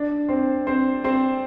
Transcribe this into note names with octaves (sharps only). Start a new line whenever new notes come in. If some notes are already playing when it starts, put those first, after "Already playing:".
Already playing: D4 D5
C4 C5
C4 C5
C4 C5